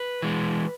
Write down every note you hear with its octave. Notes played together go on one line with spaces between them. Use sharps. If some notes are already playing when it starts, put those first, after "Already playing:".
Already playing: B4
E3 G#3